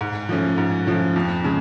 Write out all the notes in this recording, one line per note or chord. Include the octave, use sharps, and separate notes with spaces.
G#2
F3 A3 C#4
G#2
F3 A3 C#4
F2
C#3 G#3